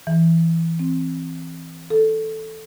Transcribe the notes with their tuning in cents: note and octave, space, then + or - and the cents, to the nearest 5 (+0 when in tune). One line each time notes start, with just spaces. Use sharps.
E3 +5
C4 +10
A4 +0